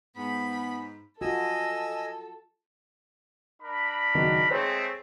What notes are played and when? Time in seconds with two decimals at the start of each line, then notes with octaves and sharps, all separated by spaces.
0.17 G#2 B3 B5
1.21 F4 F#4 A4 D#5 G#5 E6
3.63 D4 A#4 B5
4.15 F#1 D#3 F#4
4.50 G#3 A3 C4 G#4 C5 C#5